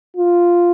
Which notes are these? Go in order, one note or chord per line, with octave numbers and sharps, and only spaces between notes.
F4